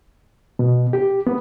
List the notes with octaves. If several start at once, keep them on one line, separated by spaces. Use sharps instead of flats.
B2
G4
B3